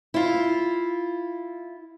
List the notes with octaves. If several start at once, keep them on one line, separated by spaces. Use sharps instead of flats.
E4 F4